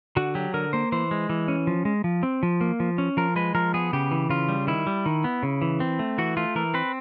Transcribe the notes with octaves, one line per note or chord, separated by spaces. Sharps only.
D3 F#4
F#3 G4
D3 A#4
A#3 C5
E3 C5
G#3
E3
C#4
F3
G#3
F3
C4
F3
A#3
F3
C#4
F3 A#4
G#3 B4
F3 A#4
B3 G#4
C#3 G4
E3
C#3 F4
G3
D#3 E4
G3
D#3
B3
C#3
E3
C4
A3
E3 F#4
A3 F4
E3 A#4
C4 B4